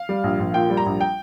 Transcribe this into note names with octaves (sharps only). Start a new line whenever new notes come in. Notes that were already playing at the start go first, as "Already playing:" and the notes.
Already playing: F5
G3
A#1
A#1
A#2 G5
G3
A#5
A#1
G5